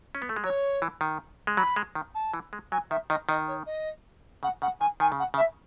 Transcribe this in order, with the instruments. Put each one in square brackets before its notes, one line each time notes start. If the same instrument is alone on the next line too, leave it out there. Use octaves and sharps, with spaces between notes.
[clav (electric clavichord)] C#4
B3
A3
G#3
[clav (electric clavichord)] F#3 [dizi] C#5
[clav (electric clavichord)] E3
D#3
G#3
[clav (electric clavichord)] F#3 [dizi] B5
[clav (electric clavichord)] G#3
D#3
[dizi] A5
[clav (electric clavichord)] E3
G#3
[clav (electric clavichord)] F#3 [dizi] G#5
[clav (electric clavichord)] D#3 [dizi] E5
[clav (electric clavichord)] D#3 [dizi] D#5
[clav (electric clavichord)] D#3 [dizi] D#5
[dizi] C#5
D#5
[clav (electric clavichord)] C#3 [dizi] F#5
[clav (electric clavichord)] C#3 [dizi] F#5
[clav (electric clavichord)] D#3 [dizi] G#5
[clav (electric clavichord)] D#3 [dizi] G#5
[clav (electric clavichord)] C#3
[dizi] F#5
[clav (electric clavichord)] C#3
[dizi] E5